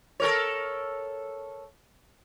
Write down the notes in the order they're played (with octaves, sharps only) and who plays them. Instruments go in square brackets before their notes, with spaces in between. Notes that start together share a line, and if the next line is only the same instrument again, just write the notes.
[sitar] A4 A#4 C#5